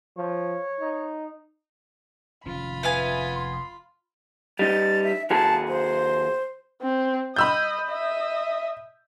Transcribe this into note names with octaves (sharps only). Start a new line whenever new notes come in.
F3 C#5
D#4
F1 D#3 C#4 F4 B5
B3 E5 F5 G#5
C6
G3 D#4 A6
E5
D#2 F#4 G#4 A5
C5
C4
D#5 B5 E6 G6
D#5 E5